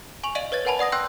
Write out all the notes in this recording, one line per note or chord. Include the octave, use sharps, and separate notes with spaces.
G#5 C#6 F7 F#7
D5 D#5 F5 D7 D#7 F#7
B4 C#5 G#6 A6
A#4 B4 F#5 G#5 A5 B5
D5 F#5 D#6 A#6
G5 C6 E6 F#6 G6 A#6